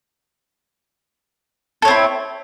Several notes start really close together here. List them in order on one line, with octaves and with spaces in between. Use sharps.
A4 C#5 C4 E4